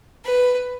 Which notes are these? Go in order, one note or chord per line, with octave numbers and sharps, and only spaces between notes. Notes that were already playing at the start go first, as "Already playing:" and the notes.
B4